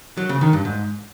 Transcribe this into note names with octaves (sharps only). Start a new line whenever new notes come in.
F#3
C#3
D#3
G2
G#2